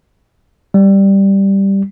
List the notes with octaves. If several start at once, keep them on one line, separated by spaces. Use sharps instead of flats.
G3